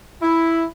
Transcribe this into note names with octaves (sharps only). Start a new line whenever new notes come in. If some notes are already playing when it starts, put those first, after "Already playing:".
E4